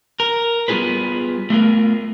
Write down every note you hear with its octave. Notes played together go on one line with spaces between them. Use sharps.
A#4
G3 B3 D#4 F4 G#4 B4
A3 B3 F4 A#4